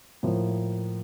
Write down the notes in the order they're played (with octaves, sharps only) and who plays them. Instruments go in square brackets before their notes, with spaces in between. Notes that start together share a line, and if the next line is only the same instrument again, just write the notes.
[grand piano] A2 F3 A#3 F4